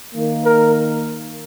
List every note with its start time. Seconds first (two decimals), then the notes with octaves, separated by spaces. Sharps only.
0.13 D#3 A#3
0.45 A#4